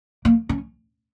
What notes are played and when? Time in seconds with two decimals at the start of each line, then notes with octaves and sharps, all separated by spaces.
0.25 A#3
0.49 C#4